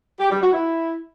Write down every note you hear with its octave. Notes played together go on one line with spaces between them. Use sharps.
G4
G3
F#4
E4